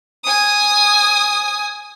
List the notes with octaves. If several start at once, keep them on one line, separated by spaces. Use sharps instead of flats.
G#5 D#6